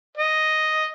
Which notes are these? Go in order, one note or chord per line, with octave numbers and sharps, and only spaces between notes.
D#5